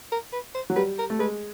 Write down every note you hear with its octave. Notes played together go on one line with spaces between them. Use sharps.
A#4
B4
C5
F#3
G3 B4
A#4
A3
G#3 B4